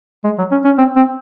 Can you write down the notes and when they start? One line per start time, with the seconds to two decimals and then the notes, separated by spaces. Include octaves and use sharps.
0.24 G#3
0.38 F#3
0.51 C#4
0.65 C#4
0.78 C4
0.96 C4